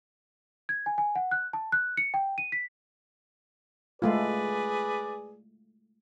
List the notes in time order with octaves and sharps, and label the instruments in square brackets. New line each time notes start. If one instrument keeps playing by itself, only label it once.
[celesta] G#6
G#5
G#5
F#5
F#6
A5
F#6
C#7
G5
D#7
B6
[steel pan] G#3 A3 F4 [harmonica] G#4 B4 D5